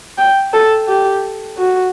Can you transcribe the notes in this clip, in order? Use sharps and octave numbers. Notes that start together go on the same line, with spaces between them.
G5
A4
G4
F#4